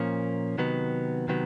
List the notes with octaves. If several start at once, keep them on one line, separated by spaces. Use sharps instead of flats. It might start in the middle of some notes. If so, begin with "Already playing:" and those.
Already playing: A#2 F3 A#3 C#4
C3 D#3 F#3 B3
C3 D#3 F#3 B3